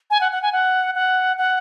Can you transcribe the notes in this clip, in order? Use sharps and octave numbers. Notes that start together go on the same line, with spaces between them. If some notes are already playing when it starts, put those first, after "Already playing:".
G#5
F#5
F#5
G#5
F#5
F#5
F#5